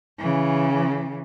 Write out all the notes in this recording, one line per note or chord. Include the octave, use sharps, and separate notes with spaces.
C#3 E3